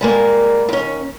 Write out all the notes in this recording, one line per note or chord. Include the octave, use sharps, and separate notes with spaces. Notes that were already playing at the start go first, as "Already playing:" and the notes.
G3 G#3 A#3
D#2 C#4